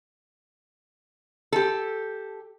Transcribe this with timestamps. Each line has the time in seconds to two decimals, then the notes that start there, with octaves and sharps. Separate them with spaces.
1.52 G4 A4